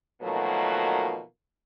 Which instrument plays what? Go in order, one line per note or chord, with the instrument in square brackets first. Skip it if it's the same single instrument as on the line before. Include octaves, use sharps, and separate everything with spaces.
[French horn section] B2 D#3 F3 F#3 A3 A#3